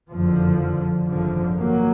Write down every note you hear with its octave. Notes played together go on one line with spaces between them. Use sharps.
F#1 F2 D3 F3
G#1 F#2 D3 F3
F#3 A#3